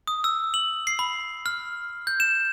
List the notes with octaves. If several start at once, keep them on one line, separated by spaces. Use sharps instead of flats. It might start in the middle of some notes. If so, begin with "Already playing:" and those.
D#6
E6
F#7
C7
B5
F6
G6
E7